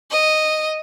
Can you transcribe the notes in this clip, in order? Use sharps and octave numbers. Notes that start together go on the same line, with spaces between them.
D#5